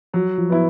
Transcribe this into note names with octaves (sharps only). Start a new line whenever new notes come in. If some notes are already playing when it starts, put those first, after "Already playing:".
F3 F#3
F3
B3 E4